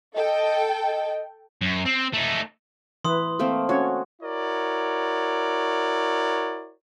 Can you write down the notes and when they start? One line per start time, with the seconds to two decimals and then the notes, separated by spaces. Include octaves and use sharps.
0.16 A4 D#5 G5
0.84 D#5
1.61 F#2
1.85 C4
2.13 A3 D#4
3.05 E3 E4 B4 C6 D#6
3.39 A3 A#3 C4
3.69 C#4 F#4 C#5
4.22 E4 F#4 A#4 C#5 D5